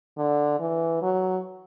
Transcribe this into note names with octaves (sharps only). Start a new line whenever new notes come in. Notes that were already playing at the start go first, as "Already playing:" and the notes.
D3
E3
F#3